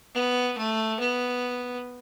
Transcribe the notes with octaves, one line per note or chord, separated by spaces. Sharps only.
B3
A3
B3